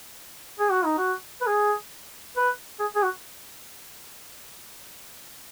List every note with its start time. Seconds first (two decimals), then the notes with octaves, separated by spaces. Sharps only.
0.60 G#4
0.71 F#4
0.85 D#4
0.98 F#4
1.41 B4
1.47 G#4
2.36 B4
2.79 G#4
2.96 G#4
3.03 F#4